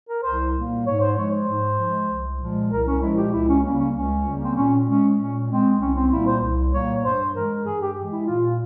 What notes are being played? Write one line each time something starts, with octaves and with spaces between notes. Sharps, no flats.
A#4
C2 C5
A#2 G3 A#3
G#2 C#5
C5
F3 G#3 C#5
C5
G#2
F3 G#3
C2
A#2 F3 G#3
C2 A#4
C#4
A#2 F3 G#3 E4
G4
C#2 E4
C#4
C#3 G3 A#3 C#4
C#4
C#2 C#4
C#3 G3 A#3
C4
A#2 C#4
G#3 C#4
A#2 C#4
G#3 C4
C2 C#4
C4
A#2 G3 A#3 E4
C5
C2
A#2 G3 A#3 C#5
G2 C5
E3 G#3 A#4
G2 G#4
G4
E3 G#3
E4
A#2 F4